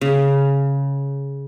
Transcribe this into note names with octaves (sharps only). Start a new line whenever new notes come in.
C#3